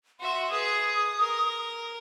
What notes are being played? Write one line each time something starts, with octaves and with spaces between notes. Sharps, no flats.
F#4 E5 C6
G#4 B4 D#6
A#4